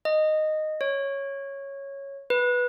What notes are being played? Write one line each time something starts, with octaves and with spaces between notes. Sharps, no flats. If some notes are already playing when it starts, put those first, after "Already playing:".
D#5
C#5
B4